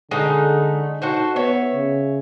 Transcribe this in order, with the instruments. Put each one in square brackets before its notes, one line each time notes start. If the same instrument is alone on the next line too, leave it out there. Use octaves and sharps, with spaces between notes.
[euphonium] D3 [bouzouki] G#3 A3 D#4
[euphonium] D#4 [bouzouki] F#4 A4 C5
[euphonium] B3 [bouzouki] C#5 E5
[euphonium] C#3